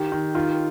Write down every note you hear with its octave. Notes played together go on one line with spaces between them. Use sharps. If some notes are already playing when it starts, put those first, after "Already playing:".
Already playing: D#3 G4
D#3
D#3 F4